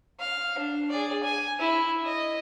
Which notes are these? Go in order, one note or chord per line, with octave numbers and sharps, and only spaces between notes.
F5
D4
G#4 D5
G#5
E4
D#5